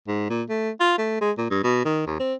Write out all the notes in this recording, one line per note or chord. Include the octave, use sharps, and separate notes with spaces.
G#2
A#2
A3
F4
A3
G#3
A#2
G2
B2
D#3
D#2
C4